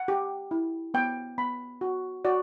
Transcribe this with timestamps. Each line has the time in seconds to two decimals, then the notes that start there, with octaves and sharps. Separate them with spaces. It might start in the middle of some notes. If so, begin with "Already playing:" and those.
Already playing: F#5
0.08 G4
0.51 E4
0.94 B3 G5
1.38 B3 B5
1.81 F#4
2.25 F#4 D5